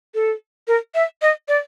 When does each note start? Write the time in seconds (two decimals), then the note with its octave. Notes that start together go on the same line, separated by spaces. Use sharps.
0.15 A4
0.68 A#4
0.95 E5
1.22 D#5
1.48 D5